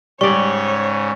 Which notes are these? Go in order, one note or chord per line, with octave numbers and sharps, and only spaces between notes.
G#2 C#3 G3 C#5 D5 C#6